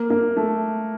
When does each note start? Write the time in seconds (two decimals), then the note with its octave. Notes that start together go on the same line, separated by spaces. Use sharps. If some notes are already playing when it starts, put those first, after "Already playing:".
Already playing: A#3
0.10 A#3
0.36 A3